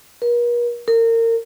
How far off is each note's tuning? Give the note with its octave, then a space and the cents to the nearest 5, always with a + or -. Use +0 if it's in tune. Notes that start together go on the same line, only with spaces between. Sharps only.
A#4 +45
A#4 -30